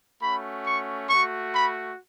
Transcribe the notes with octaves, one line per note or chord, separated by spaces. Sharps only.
A3 C#4 F#4 B5
C#6
A3 F#4 C#6
B5